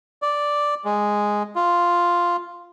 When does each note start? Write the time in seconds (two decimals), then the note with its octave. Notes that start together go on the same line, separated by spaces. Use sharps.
0.22 D5
0.85 G#3
1.56 F4